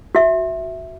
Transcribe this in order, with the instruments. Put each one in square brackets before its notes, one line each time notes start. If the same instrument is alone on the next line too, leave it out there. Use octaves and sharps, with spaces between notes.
[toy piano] F#4 E5